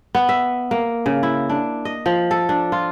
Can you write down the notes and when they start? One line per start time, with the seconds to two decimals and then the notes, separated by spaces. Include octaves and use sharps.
0.15 B3
0.29 E5
0.71 A#3
1.06 C#3
1.23 E4
1.50 D4
1.85 D#5
2.06 F3
2.31 A4
2.49 D4
2.72 F4